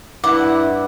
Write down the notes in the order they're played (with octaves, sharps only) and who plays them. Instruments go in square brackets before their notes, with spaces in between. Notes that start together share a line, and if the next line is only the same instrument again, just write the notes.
[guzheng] G2 B5 [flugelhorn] E4 [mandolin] F#5 [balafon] D6